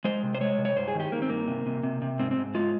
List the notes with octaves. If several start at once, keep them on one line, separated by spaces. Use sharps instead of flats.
G#3 C5
C3
C5
G#3 C#5
C3
C#5
G2 C5
G#4
D#3 G4
D#3 A#3
C4
G2 A#3
C3
C3
C3
C3
G#2 C4
C4
G#2
G#3 F4